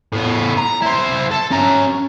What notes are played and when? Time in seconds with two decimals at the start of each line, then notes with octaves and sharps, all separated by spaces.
0.13 A2 B3
0.57 A#5
0.82 E4 C5
1.31 A4
1.51 C#4 A#5